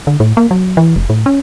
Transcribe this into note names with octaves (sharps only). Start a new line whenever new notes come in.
D3
A2
A#3
F#3
E3
F1
A2
C#4